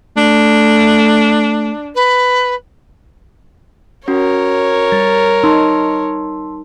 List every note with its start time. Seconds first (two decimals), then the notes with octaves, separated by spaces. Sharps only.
0.17 A3 D4
1.95 B4
4.08 C#4 F#4 A#4 C#5
4.92 G3 A6
5.44 D#4 A5 C6 E6